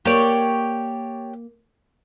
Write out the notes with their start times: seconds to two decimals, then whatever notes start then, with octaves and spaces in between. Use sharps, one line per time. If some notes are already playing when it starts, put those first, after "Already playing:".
0.05 A#3 G4 C#5 D5